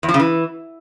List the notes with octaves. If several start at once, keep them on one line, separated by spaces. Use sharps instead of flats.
E2
F3
C#3
E3